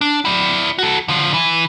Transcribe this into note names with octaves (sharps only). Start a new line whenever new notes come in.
D4
E4 D5
F#4 A4
D3 F3
E3